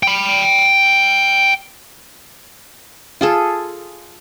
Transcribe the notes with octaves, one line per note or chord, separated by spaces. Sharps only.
G5 B5
F4 G#4 A4